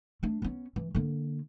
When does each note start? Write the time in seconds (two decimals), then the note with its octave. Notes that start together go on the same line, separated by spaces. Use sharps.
0.23 A3 D4
0.42 B3 C#4
0.76 E3
0.95 D3 A#3